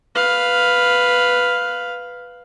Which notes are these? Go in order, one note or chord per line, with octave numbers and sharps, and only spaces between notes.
B4 F5